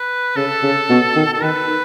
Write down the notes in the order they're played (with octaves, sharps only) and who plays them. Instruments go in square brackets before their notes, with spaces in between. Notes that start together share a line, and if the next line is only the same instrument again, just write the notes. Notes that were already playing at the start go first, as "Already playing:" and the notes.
Already playing: [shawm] B4
[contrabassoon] C#3 [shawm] A4
[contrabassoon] C#3
B2
D#3
[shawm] A4
[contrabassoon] D#3 [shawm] B4